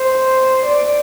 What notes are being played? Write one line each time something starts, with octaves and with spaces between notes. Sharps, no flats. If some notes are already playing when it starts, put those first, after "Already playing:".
Already playing: C5
D5